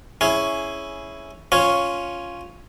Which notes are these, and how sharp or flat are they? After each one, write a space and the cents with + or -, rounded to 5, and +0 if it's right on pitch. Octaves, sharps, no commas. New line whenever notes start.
C#4 +0 E4 +0 G#4 +10
C#4 +0 F4 +0 C#5 +0